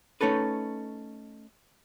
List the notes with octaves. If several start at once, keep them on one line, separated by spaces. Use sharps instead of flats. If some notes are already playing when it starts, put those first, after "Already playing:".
A3 C#4 D#4 A4 B4